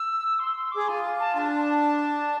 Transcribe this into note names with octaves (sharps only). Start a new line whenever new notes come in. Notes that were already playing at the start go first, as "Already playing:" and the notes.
Already playing: E6
C6
C6
G#4 D6
F4 G#5
A5
D4 A5